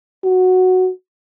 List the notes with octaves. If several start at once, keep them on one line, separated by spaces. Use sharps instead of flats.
F#4